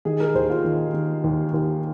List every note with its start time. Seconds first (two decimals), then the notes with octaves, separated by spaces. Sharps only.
0.05 D#3 G#4
0.20 A#4
0.35 D#2 C5
0.50 F4
0.64 D#3
0.94 D#3
1.24 D#2
1.54 D#2